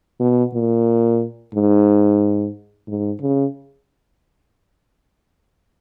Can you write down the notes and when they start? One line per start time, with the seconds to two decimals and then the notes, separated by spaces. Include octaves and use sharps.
0.20 B2
0.54 A#2
1.54 G#2
2.88 G#2
3.21 C#3